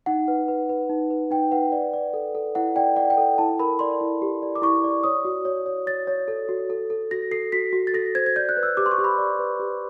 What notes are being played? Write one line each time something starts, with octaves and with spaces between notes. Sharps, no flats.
D#4 F#5
B4
B4
B4
D#4
B4
D#4 G5
B4 F#5
D5
D5
A4
A4
E4 F#5
D5 G5
D5 F#5
G5
A4
E4 A5
A#4 B5
D5 C6
E4
G4
D5
D6
E4 C#6
D5
C#5 D#6
F#4
C#5
C#5
C#5 A6
C#5
A4
F#4
A4
A4
F#4 A#6
A4 C7
F#4 B6
F#4
A6
A4 A#6
C5 G#6
G#6
D5 G6
F#6
B4
E6
G4 D6
C6
C#6
G4
B5
D5
B4
G4